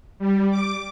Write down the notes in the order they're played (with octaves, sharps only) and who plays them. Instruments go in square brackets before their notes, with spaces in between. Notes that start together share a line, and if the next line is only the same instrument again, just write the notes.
[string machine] G3
D6